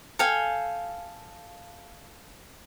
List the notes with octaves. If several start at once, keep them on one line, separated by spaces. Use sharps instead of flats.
A4 F5 G5 G#5